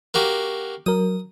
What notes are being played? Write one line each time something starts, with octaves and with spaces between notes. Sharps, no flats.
A#3 F#4 G4
F#3 A#4 D#6